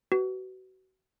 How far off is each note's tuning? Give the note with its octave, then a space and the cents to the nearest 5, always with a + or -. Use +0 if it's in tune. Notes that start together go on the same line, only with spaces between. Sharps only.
F#4 +30 B4 +10